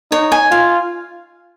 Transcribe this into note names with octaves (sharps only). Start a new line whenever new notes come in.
D#4 C#5
G#5
F4 F5